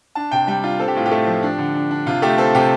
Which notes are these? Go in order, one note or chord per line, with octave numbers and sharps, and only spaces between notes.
D4 A5
C3 G5
G3 G5
D4 F4
C4 A4
G4
A2 F4
G4
A3
F3
D4
D3
D4
D4
C3 F4
A3 G4
C4 A4
C3 G4